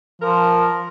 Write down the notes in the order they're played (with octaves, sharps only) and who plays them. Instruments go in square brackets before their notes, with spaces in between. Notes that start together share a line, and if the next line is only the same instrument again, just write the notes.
[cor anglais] F3 [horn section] A#4